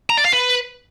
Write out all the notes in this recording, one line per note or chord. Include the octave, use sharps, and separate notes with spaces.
A#5
D5
F5
B4